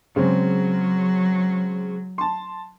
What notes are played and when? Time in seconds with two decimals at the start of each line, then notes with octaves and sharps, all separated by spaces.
0.16 C#3 F#3 G#3 C4
2.18 A5 C6